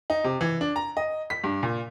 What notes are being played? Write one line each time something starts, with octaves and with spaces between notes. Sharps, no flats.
D#4
C3
E3
D4
A#5
D#5
B6
G2
A#2